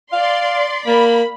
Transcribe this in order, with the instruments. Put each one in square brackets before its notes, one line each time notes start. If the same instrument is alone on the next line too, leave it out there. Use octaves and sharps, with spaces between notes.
[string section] D5 C6 [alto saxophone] F5
[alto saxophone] A#3 [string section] B5